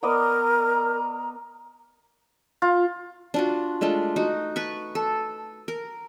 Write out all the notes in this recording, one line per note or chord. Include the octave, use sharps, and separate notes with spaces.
B3 A#4 D5 D#5 A#5
F4
D4 F4 F#4
G#3 A3 D4 F4
D#4 F#4
B4 A5 C#6
A4
A#4